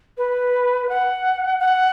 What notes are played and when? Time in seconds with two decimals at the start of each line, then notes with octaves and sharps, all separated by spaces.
0.18 B4
0.89 F#5
1.59 F#5